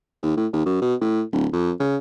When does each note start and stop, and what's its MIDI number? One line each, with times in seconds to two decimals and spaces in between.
0.23 0.32 39
0.37 0.47 45
0.53 0.64 39
0.66 0.78 42
0.82 0.95 47
1.01 1.23 45
1.33 1.47 26
1.53 1.71 41
1.80 1.97 49